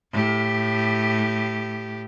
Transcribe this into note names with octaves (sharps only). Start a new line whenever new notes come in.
A2 G4